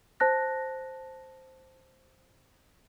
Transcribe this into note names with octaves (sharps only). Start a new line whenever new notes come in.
C5 A5 F#6 A#6